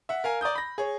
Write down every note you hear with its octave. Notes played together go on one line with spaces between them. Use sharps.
E5 F#5
A#4 F5 G#5
D5 A#5 D#6 G6
B5 A#6
G#4 C#5